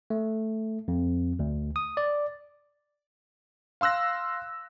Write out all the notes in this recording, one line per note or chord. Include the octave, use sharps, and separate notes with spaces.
A3
F2
D2
D#6
D5
F5 C6 E6 F#6 A#6